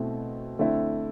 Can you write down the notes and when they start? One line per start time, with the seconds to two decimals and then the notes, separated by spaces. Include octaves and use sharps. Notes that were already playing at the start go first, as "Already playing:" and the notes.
Already playing: B2 A3 C4 E4
0.59 D3 A3 C4 E4